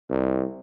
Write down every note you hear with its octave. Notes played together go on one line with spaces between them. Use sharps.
C2